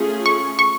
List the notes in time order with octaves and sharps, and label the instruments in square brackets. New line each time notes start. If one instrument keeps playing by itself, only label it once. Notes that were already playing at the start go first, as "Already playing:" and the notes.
Already playing: [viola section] A3 C#4 F4 G#4
[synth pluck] C#6
C#6